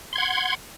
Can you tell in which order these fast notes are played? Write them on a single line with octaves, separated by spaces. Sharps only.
C6 G#6 F#5